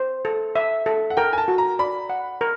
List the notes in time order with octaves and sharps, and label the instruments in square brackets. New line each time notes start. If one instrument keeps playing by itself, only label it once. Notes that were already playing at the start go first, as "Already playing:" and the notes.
Already playing: [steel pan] C5
A4
E5
A4
[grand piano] F#5
[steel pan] A#4 [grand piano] G5
[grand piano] G#5
A5
[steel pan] F#4
[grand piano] A#5
[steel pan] D5 [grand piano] B5
[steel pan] F#5
A#4